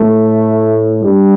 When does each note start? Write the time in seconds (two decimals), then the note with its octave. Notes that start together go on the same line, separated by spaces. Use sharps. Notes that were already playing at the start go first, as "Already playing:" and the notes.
Already playing: A2 A3
1.02 G2 G3